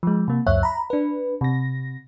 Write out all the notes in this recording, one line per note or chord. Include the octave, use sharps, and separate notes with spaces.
F3 G#3
C3 A#3
C#2 F#2 C#5 E5 F#6
A#5 B5
D4 B4
C3 A#6